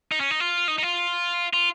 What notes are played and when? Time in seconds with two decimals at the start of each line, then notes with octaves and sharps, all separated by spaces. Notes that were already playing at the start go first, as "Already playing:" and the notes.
0.12 D#4
0.20 C#4
0.31 D#4
0.40 F4
0.68 D#4
0.78 D#4
0.83 F4
1.53 F4